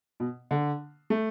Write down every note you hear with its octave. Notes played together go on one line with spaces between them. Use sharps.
B2
D3
A3